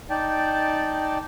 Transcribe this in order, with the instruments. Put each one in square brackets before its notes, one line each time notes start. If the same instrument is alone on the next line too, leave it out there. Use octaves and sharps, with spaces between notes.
[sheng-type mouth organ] D#4 D5 G5 A5